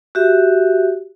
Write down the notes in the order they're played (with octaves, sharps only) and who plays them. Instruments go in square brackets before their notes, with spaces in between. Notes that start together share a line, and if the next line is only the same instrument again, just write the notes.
[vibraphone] F#4 G4 E5